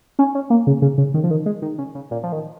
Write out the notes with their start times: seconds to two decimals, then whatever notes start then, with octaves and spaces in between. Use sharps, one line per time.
0.19 C#4
0.35 C#4
0.50 A#3
0.67 C#3
0.82 C#3
0.98 C#3
1.14 D#3
1.24 F3
1.31 D#3
1.46 G#3
1.62 D#3
1.78 C#3
1.95 C#3
2.11 A#2
2.23 F3
2.32 D#3